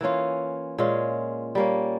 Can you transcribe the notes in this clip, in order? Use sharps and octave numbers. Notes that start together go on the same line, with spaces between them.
E3 A#3 C#4 F4
A#2 G#3 C#4 F4
G3 A#3 C#4